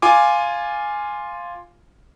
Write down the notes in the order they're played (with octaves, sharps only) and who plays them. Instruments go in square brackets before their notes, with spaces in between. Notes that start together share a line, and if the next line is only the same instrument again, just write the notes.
[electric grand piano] F4 G#5 D6